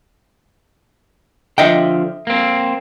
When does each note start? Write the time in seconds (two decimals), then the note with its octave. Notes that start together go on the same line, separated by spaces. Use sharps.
1.58 D3 F3 D#5 E5 G5
2.27 A#3 C4